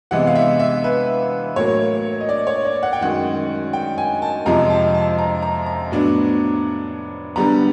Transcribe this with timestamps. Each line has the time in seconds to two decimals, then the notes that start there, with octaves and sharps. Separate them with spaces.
0.11 C3 E3 G#3 B3 F#5
0.27 F5
0.35 E5
0.60 E5
0.84 B4
1.56 A2 F#3 A#3 C#5
2.21 D#5
2.29 D5
2.47 C#5
2.65 D5
2.83 F#5
2.93 G5
3.01 F#2 D#3 G#3 F#5
3.73 G5
3.98 G#5
4.22 A5
4.46 F2 C3 F3 G#3 A#5
4.70 A5
4.94 A5
5.19 A#5
5.42 A#5
5.66 A#5
5.91 A2 F#3 B3 D4
7.36 D3 G3 B3 A#5